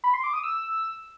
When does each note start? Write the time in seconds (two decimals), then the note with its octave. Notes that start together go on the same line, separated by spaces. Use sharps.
0.04 B5
0.14 C6
0.24 D6
0.33 D#6
0.43 E6